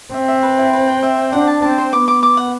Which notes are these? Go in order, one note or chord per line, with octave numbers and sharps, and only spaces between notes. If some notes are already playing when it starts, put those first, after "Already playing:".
C4 E5
E5
B4
E4
B4
G5
E5
G5
D4 F#5
A5
C4 A5
C5
B3 D6
D6
D6
F#5